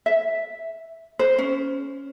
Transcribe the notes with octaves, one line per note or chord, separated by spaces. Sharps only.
E5
C5
C#4